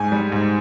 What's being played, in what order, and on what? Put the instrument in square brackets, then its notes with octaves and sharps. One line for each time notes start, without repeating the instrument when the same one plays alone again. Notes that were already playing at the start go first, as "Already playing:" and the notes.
Already playing: [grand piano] G#2 G#5
G3
G#2